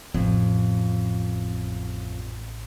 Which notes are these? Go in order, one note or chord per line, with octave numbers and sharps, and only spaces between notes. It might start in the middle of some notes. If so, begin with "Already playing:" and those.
A1 F2